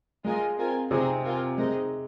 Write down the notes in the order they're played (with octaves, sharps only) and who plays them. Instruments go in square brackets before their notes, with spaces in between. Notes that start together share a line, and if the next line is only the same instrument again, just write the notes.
[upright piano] G#3 [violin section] F4 A#4 D#5 G#5
[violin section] C4 F4 A#4 G#5
[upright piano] C3 C4 [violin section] D#4 G#4 D#5
[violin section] F4 A#4 G#5
[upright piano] G#3 [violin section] C4 D#4 A#4 D#5